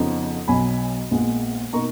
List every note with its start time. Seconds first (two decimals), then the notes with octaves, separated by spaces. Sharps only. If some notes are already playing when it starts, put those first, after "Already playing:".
Already playing: F2 C#3 F3 B3 D#4
0.48 B1 B2 F#3 G#5 B5
1.11 A#1 A#2 G#3 B3
1.73 B2 A#3 D#4 A#5 C#6